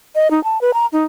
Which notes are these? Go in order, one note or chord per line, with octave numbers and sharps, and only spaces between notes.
D#5
D#4
A5
B4
A#5
D#4